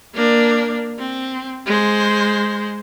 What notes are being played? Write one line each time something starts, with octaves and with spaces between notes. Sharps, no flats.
A#3 D4
C4
G#3 C5